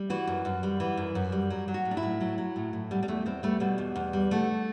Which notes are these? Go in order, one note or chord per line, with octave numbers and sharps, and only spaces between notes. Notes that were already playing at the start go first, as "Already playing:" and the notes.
Already playing: G3
E3 F#4
F#2
F#2
G3
E3
F#2
F#2
G3
F#3
F#3
F#4
A2
D4
E4
A2
F#3
F#3
A2
A2
B2 G3
G3
E2 A3
E2 C4
G3 A3
B2 G3
E2
E2
G3
D3 A3